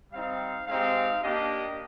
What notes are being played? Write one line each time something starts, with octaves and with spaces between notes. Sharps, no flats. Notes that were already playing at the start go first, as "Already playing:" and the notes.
G3 C4 D#4 F5
G#3 C4 D#4 G4 F5
A#3 D4 G4 D#5